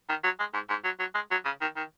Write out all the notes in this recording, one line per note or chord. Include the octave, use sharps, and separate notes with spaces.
D#3
F#3
G#3
G#2
G#2
F#3
F#3
G#3
F#3
C#3
D#3
D#3